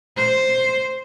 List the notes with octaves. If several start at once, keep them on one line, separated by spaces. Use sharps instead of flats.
C5